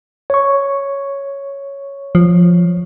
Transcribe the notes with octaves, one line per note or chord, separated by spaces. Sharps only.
C#5 C#6
F3